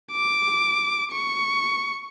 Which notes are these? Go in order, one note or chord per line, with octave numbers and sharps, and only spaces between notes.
D6
C#6